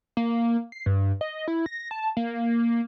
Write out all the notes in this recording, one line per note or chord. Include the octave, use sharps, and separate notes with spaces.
A#3
C7
G2
D#5
E4
A#6
A5
A#3